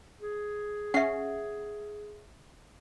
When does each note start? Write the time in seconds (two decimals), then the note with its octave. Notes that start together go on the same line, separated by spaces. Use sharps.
0.20 G#4
0.94 C#4 E5 F#5 C7